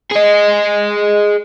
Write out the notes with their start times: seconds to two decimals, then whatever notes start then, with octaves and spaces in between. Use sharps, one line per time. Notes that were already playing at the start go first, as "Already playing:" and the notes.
0.12 G#4 D#5